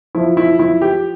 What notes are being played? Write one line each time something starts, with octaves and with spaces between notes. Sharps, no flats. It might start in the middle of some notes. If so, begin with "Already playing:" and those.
F3 E4
E4
F3 E4
G4